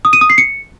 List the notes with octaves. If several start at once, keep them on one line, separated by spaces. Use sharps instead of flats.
D#6
D#7
D#6
C7
C#7